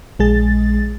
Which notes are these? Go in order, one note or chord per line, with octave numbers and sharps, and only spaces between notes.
A#1 G#3 G#4 A6